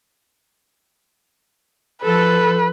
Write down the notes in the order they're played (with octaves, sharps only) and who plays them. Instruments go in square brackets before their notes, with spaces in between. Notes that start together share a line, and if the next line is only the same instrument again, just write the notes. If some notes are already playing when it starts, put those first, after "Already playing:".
[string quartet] F3 [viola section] A4 [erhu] B4